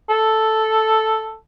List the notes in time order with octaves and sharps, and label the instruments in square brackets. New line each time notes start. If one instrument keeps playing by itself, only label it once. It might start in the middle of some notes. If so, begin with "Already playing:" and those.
[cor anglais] A4